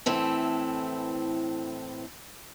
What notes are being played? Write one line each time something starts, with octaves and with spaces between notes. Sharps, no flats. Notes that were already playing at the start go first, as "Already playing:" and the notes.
A2 E3 C4 A4